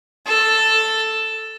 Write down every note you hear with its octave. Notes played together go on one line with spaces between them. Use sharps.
A4